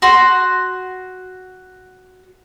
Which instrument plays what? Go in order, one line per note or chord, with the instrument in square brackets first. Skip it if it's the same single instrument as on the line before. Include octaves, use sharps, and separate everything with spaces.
[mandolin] F#4 C6